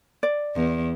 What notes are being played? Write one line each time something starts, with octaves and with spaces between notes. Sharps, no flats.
D5
E2